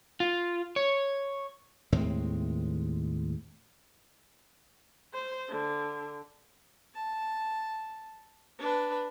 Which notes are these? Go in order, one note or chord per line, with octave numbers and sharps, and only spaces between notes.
F4
C#5
D#2 A2 G#3 C4
C5
D3
A5
D4 B4